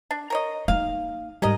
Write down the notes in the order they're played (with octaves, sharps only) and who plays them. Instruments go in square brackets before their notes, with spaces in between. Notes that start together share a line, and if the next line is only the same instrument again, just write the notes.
[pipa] D4
A#4 C#5 D#5
[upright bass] A#3 D#4 [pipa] F5
[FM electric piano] G#2 G3 [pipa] C#4 A#4 D#5